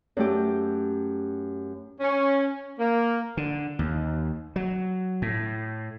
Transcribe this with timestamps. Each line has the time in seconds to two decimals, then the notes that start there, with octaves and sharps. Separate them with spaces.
0.17 F#2 A3 G4
2.00 C#4
2.79 A#3
3.37 D3
3.79 D#2
4.56 F#3
5.22 A2